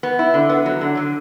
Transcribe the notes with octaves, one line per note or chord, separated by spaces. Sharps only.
B3
E4
D3
B3
F#3
D3
D3